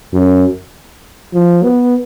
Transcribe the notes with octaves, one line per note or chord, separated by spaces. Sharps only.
F#2
F3
B3